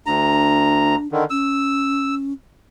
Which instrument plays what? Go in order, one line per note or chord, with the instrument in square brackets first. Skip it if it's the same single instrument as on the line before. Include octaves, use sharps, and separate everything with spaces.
[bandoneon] D2 A#5 [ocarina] D4
[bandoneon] D3 D#3
[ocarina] C#4 [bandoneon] E6